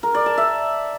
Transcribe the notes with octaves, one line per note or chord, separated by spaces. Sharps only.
A#4
D5
A5
E5